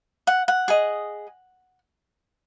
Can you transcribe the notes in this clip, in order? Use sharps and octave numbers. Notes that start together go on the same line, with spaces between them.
F#5
F#5
G#4 D#5